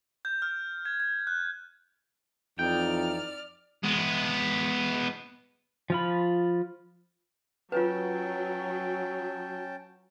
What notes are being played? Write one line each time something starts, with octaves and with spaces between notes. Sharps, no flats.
G6
F6
G#6
G#6
F#6
F2 E3 D#4 D5 G5 F6
G#3 B3
F3 F4 B5
F#3 C#4 F4 B4 G5 A5